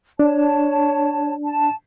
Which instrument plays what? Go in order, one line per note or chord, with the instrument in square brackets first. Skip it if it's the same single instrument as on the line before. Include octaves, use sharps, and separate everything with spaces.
[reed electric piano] D4 [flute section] C#5 A5
[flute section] A5